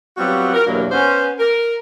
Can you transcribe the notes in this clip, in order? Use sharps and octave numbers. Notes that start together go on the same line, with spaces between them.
F#3 G3 B3 C4 F4 F#4
A#4
E2 G2 B2 F#3 A#3 D4
B3 C#4 C5
A#4